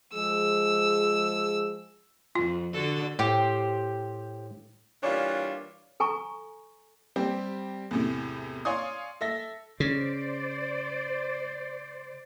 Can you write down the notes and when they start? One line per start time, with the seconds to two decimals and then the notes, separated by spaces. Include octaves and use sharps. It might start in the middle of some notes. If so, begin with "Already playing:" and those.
0.14 F3 G#3 G#4 E6
2.35 F2 F4
2.73 D3 F#4 A4
3.19 A2 G4 C5
5.03 E3 G3 A#3 D4 F4 C#5
6.00 A4 G#5 A#5 C#6
7.16 G3 C4 G4
7.91 E2 A2 C3
8.65 C#5 D5 F5 G#5 C6 D#6
9.21 A4 E5 A#6
9.80 C#3 C5 D5